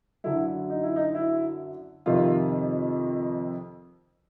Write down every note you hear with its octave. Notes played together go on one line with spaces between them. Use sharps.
F#2 D3 F#3 E4
D#4
E4
D#4
E4
F2 C3 D#3 F4